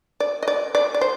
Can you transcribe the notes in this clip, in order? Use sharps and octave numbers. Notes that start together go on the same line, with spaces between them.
D5
D#5
D5
D5
D5
C5